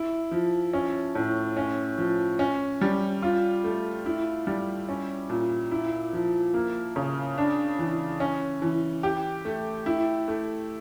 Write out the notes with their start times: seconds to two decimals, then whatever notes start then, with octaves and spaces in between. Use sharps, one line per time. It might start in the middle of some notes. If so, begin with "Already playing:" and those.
Already playing: E4
0.31 F3
0.73 C#4
1.15 A2
1.57 C#4
1.98 F3
2.39 C#4
2.81 G3
3.22 F4
3.64 A3
4.06 E4
4.47 G3
4.89 C#4
5.30 A#2
5.71 E4
6.13 F3
6.54 A#3
6.96 C#3
7.38 D4
7.79 E3
8.20 C#4
8.62 E3
9.03 G4
9.45 A3
9.86 E4
10.28 A3